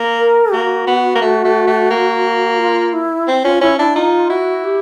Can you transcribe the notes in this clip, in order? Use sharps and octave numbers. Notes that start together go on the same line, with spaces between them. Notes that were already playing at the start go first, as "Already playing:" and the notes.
Already playing: A#3
A#4
A#3 F#4
B3
A#3
A3
A3
A3
A#3
F4
E4
C4
C#4 F4
C#4 E4
D4 E4
D#4 F4
E4 F#4
G4